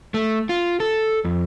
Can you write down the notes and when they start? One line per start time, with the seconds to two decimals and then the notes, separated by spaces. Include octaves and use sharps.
0.14 A3
0.49 F4
0.80 A4
1.25 F2